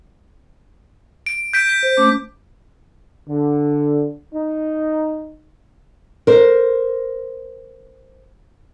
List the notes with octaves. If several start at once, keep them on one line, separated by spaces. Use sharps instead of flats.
D7
G6 B6 D7
B6
C5
A3 C#4 D6
D3
D#4
A#4 C5